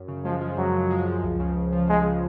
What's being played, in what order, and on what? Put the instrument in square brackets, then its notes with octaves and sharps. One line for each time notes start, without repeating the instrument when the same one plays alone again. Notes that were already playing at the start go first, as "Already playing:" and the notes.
Already playing: [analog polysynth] F#2
C#3
[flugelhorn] F3 [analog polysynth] G#3
[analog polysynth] F3
[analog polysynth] F#2 [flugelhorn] F#3
[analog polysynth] C#3
G#3
F3
C#2
C#3
C#2
F3
[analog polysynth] C#2 [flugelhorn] G#3
[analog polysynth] C#3